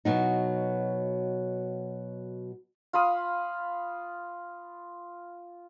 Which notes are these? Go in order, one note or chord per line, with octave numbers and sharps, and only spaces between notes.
B2 F#3 D#4
F4 F5 B5 D#6